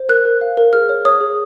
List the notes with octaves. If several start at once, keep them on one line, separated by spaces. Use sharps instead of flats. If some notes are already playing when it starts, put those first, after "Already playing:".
Already playing: C5
A#4 F#6
A#4
F5
A#4
G#4 F6
C#5
C#5 D#6
G#4